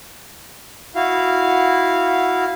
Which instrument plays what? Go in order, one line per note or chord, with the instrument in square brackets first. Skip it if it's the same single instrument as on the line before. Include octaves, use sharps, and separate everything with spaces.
[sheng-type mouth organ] E4 F#4 F5